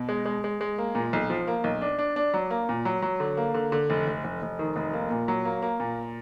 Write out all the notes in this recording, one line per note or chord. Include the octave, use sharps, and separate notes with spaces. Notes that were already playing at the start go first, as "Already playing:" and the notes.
Already playing: B2
G#3
G#3
G#3
G#3
A#3
A#2
B1
F3
A#3
B1
D4
D4
D4
F#3
A#3
A#2
F#3
F#3
D3
A#3
D3
D3
F1
F1
F1
F1
D#3
F1
A#3
A#2
F#3
A#3
A#3
A#2